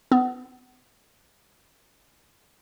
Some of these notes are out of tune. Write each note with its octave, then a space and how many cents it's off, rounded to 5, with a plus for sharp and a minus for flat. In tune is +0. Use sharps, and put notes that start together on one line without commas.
B3 +35